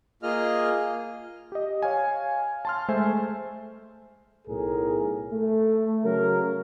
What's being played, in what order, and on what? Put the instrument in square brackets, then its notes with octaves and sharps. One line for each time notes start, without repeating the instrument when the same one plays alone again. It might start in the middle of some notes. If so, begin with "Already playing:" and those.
[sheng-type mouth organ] A#3 F4 G#4 D#5 F6
[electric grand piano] G4 D#5
C#5 F5 G#5
A5 C6 F6
G#3 A3 C5 E5 G#5
[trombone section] B1 A2 G#4 A#4
A3
C#3 F#3 A#4